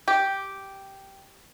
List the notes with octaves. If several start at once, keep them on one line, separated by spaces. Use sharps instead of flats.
G4